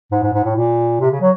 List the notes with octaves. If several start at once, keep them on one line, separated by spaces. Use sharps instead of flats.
G#2
G#2
G#2
A2
A#2
C3
C#3
F#3